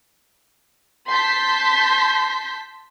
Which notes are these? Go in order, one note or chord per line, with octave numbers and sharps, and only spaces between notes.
A5 C6 G6 B6